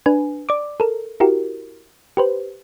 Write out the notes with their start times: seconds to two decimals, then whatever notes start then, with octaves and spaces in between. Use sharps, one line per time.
0.06 D4 B4 G#5
0.49 D5 D6
0.80 A4 A#4
1.20 E4 F#4 G4 A#4
2.17 G4 B4 C5